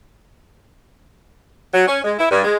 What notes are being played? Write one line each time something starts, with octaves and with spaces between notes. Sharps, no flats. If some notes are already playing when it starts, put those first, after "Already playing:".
F#3
C#4
G#3
E4
G2
G#3